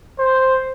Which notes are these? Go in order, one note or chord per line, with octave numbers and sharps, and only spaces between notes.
C5